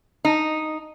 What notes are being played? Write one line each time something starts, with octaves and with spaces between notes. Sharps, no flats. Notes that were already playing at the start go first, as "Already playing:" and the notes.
D#4